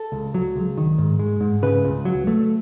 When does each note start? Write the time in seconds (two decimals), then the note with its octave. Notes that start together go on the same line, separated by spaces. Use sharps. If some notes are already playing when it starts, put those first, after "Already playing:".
Already playing: A4
0.12 C#2
0.34 F#3
0.56 C#2
0.77 D#3
0.98 G#2
1.19 G#3
1.41 G#2
1.62 C#3 B4
1.84 C#2
2.05 F#3
2.27 A3